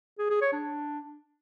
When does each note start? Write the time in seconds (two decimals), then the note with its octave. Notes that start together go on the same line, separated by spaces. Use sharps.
0.19 G#4
0.30 G#4
0.41 C#5
0.53 D4